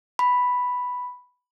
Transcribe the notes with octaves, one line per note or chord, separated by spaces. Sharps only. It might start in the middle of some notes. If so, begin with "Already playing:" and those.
B5